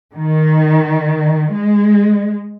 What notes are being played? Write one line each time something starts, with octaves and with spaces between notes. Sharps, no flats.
D#3
G#3